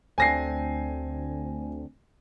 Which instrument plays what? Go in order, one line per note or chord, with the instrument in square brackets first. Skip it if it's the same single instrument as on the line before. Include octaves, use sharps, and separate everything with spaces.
[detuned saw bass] D2 [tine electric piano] A3 C4 D4 [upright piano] G#5 A#6 C7